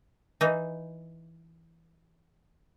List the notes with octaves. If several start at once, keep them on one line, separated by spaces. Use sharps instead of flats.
E3 D#4